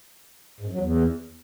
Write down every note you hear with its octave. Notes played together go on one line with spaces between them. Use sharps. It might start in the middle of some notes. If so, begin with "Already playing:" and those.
G#2
F#2
F#3
E2